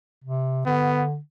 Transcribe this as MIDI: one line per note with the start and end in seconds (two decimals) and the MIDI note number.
0.24 0.63 48
0.66 1.19 50
0.66 1.04 59